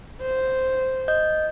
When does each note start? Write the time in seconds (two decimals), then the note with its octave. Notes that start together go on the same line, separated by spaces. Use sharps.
0.22 C5
1.08 D#5 G6